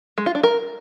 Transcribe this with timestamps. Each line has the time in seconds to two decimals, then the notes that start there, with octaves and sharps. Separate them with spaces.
0.18 G#3
0.26 F4
0.35 D4
0.43 A#4